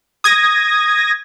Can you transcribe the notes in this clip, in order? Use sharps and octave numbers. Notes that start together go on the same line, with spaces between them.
D#6 G#6 A#6